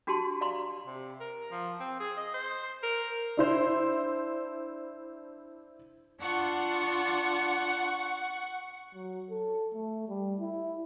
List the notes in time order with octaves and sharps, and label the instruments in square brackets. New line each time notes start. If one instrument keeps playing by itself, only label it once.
[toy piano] D4 F#4 G4 G#5 A5 C6
D5 F5 A#5 C6
[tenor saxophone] C3
A#4
F3
C4
G#4
D#5
C5
A#4
[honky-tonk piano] D4 E4 C5
[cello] D4 F4 [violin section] F#5 C#6
[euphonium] F#3
A4
A3
G3
E4